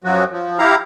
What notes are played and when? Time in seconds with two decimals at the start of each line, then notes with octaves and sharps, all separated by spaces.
0.04 F#2 F3 F#3 F#4
0.31 F3
0.59 E4 G4 F5 A#5